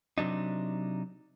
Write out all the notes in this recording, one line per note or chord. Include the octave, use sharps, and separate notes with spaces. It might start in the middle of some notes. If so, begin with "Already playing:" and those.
C3 F#3 D4 D#4